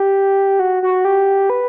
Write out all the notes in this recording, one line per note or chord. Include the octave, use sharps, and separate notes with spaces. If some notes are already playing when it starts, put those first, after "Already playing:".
Already playing: G4
F#4
F#4
G4
B4